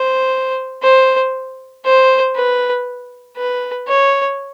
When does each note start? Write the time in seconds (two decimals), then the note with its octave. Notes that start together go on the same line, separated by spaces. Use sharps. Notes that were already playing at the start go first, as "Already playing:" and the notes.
Already playing: C5
0.82 C5
1.85 C5
2.35 B4
3.37 B4
3.88 C#5